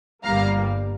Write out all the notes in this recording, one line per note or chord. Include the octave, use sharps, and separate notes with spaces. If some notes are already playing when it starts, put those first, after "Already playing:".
G1 G2 G3 A#3 F5 A#5